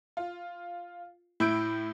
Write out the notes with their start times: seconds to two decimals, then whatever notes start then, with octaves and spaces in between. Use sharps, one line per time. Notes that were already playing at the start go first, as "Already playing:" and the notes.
0.17 F4
1.40 A2 E4 G6 D7